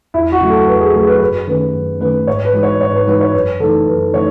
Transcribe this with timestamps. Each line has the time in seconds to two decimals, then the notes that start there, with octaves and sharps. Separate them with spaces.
0.14 E2 E4
0.32 F#4
0.41 C#3 F#3 A3
0.50 A4
0.67 E2 B4
0.81 G#4
0.94 C#3 F#3 A3 G#4
1.07 B4
1.21 F#2 B4
1.47 D#3 A3 C#4 B4
1.74 F#2
2.00 D#3 A3 C#4 B4
2.27 G#2 C#5
2.45 B4
2.53 E3 G#3 D#4 F#4
2.63 C#5
2.80 G#2 C#5
2.94 B4
3.07 E3 G#3 D#4 F#4 B4
3.21 C#5
3.34 F#2 B4
3.60 C#3 E3 A3 D#4 A4
3.87 F#2 B4
4.14 C#3 E3 A3 D#4 C#5